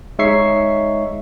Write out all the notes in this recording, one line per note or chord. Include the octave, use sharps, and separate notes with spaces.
G#3 D#4 C#5 E5 C#6 C7